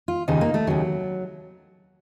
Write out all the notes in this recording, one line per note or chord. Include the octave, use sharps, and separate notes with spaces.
F4
D#2 C#3 D#4
A#3
A3
D#2 C#3 F#3